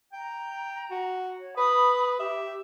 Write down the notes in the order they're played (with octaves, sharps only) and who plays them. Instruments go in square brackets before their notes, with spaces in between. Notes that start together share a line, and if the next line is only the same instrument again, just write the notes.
[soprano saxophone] G5 [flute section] A#5
[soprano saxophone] F#4
[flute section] C#5
[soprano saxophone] B4 [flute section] B5 D#6
[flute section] G4 [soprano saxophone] E5